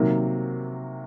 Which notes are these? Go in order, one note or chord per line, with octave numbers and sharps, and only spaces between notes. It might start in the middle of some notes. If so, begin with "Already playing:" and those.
Already playing: C3 D#3 F#3 A#3